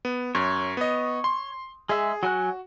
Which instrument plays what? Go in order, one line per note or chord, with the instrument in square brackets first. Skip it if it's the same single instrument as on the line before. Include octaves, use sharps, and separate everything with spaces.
[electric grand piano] B3
[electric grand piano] F#2 [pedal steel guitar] C#5
[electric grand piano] B3 D#5
C6
[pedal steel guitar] G#3 E5 [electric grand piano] G#4
[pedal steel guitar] F#3 G#5 F#6 [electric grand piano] F#4